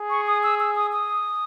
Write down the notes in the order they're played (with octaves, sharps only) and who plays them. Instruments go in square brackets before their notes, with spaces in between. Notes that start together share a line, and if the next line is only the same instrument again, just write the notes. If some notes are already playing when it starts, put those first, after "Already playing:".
Already playing: [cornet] G#4
[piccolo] C#6
D#6
E6
E6
D#6
D#6